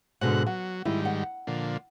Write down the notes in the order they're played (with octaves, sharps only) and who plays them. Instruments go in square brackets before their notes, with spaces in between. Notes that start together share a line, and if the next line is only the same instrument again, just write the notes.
[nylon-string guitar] G#2 B2 D3 [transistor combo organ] F#4 F#5
[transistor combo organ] F#3 [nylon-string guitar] F#5
[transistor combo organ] G#2 D#3 G3 [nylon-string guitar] E4
[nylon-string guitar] F#5
[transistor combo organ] A#2 D3 F3